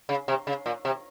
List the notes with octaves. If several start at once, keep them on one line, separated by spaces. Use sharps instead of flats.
C#3
C3
C#3
A#2
C3